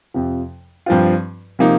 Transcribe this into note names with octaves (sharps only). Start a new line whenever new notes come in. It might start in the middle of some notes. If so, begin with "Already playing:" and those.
F2 C3 F3
G2 F3 C4 F4
C3 F3 A#3 D#4